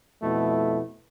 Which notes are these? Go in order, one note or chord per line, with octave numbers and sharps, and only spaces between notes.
F2 B2 A3 E4